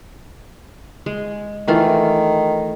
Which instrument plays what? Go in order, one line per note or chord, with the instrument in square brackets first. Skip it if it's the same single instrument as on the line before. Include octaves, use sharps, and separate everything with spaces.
[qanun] G#3
[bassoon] D#3 [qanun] E3 A3 F4